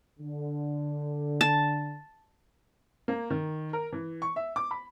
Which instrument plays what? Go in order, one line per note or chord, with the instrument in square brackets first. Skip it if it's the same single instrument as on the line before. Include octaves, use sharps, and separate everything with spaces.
[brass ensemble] D3
[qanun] A5
[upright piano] A#3
D#3
A#4
E3
C#6
E5
D6
B5